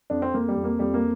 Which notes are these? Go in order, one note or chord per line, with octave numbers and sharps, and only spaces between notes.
F2 D4
C4
F2 A#3
G3
F2
A#3
F2 G3
A#3